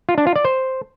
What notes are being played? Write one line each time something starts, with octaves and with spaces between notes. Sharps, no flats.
F4
D4
F4
D5
C5